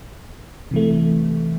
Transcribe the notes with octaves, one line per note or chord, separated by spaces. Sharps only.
C3 E3 A3